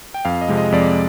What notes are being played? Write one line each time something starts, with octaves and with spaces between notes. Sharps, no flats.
G5
F2 F5
D#5
C3 F3 G#3
D#5
F2 D5